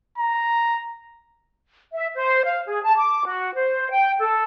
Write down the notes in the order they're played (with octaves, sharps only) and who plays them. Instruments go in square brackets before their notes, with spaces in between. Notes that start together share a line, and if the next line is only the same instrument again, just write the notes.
[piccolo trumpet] A#5
[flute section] E5
C5
F5
G#4
A5
D6
F#4
C5
G5
A4